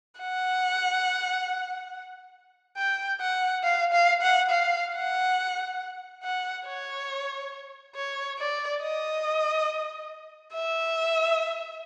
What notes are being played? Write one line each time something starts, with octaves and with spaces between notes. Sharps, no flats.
F#5
G5
F#5
F5
F5
F#5
F5
F#5
F#5
C#5
C#5
D5
D#5
E5